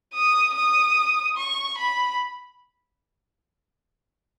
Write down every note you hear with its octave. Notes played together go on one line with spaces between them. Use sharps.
D#6
D#6
C#6
B5